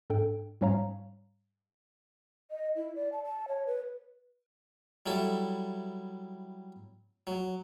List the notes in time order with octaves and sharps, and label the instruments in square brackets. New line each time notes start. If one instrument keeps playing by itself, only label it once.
[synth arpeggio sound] G#2 D4 A4 G5
G#2 G3 C#4 C#5 F5 A#5
[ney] D#5
E4
D5
A5
A5
C#5
B4
[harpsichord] F#3 G3 E4 A4
F#3